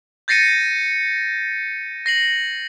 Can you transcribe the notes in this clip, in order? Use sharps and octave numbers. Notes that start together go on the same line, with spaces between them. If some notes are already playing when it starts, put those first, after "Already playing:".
G6 A6 A#6 C7 C#7 D#7
A#6 C7 F#7